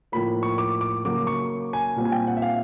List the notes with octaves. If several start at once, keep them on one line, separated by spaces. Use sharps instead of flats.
A2 F3 A#3 B5
C#6
D6
D6
C#3 F#3 A#3 D6
C#6
G#5
A#2 G3 C4
G#5
G5
F#5
E5
F5